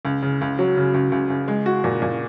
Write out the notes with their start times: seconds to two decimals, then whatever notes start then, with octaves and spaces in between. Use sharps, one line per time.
0.05 C#2
0.22 C#3
0.41 C#2
0.59 F#3
0.77 C#3
0.94 C#2
1.12 C#2
1.30 C#2
1.48 G#3
1.66 F#4
1.84 A#2
2.02 A#2